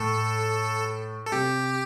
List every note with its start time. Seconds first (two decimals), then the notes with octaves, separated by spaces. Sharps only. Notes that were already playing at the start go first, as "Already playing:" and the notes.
Already playing: A2 A4
1.26 A4
1.32 C3 G4